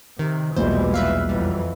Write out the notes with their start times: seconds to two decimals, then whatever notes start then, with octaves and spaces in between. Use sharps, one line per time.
0.19 C3 D#3
0.57 B1 E2 A#2 E3 G3 G#3 C5
0.94 B4 E5 F5
1.29 F2 E3 F#3 G3